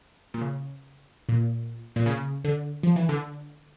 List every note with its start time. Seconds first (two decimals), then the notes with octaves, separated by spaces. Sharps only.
0.34 A#2
0.41 C#3
1.29 A#2
1.96 A#2
2.06 C#3
2.45 D3
2.83 F3
2.96 E3
3.09 D3